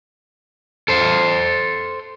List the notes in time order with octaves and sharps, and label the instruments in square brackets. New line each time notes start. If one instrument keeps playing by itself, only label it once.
[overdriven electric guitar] A4 C5